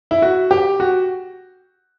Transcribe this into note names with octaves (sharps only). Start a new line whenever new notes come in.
E4
F#4
G4
F#4